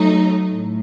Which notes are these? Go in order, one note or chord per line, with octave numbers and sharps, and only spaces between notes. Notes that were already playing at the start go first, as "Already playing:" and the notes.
Already playing: F#3 A3 D#4
A2